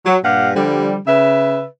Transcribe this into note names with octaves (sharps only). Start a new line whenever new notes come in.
F#3
G2 A#2 G4 F5 F#5
D3 F3 G3
C#3 B4 E5